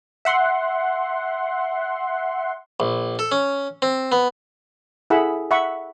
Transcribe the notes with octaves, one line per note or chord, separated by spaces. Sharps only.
E5 F#5 C6
A#1
A4
C#4
C4
B3
E4 G#4 A4 F#5 B5 E6
E5 F#5 B5 C#6